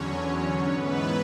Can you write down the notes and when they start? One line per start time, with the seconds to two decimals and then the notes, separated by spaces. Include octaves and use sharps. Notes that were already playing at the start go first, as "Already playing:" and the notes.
Already playing: E2 D3 F#3 C#4 C#5
0.64 G#2 E3 B3 B4